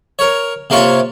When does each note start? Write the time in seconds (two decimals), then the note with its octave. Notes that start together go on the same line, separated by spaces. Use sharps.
0.19 A#4 C#5
0.70 C3 A#3 F4 C#5 C#6